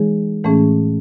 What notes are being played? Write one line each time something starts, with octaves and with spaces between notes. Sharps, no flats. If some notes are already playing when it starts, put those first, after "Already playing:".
Already playing: E3 G#3 D#4 G#4 C#5
A2 E3 A3 C#4 G#4